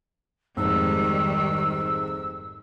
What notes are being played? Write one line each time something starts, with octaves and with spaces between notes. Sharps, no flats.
F1 G#2 D#3 G3 E6